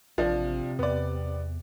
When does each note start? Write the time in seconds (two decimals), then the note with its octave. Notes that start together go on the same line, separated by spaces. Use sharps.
0.18 A1 C3 F3 D4
0.79 E2 B3 D5